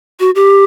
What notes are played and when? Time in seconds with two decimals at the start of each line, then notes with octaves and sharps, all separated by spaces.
0.20 F#4
0.35 G4